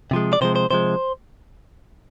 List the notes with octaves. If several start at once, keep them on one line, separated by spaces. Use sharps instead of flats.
C3 F3 G#3
D5
C3 F3 G#3 C5
C5
C3 F3 G#3 C5